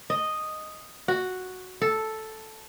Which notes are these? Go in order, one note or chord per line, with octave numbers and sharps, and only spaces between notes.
D#5
F#4
A4